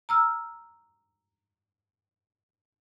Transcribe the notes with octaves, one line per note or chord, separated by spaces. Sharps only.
A#5 E6 F6